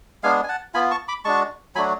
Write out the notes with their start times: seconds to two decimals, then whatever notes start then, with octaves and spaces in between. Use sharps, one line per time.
0.23 G#3 B3 D4 F5 G#5
0.44 G#5
0.49 F#5 A5
0.74 B3 F4 G#5 B5
0.91 A5 C#6
1.08 B5 D6
1.25 G#3 D4 F#4 A5 C#6
1.75 F#3 A3 D4 F#4 G#5 B5